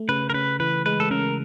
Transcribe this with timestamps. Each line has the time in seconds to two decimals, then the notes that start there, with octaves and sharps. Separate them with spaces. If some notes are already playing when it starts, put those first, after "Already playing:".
Already playing: A3
0.09 C#3 B4
0.30 A#4
0.34 C#3 B4
0.60 E3 B4
0.86 G#3 B4
1.00 A4
1.11 C#3 A#4